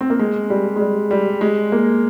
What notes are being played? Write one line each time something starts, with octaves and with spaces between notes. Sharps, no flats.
C4
A#3
G#3
G3
G#3
G3
G3
G#3
A#3